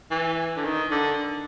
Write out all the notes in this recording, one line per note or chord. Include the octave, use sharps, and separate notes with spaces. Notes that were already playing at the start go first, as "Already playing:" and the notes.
E3
D3
D#3
D3